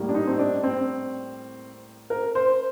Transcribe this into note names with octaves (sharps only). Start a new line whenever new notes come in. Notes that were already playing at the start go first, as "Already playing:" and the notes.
Already playing: A2 G3 A#3
D4
D#4
C4
D4
C4
A#4
C5